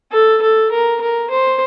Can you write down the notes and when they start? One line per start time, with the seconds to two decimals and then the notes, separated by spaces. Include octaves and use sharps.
0.12 A4
0.42 A4
0.72 A#4
1.01 A#4
1.30 C5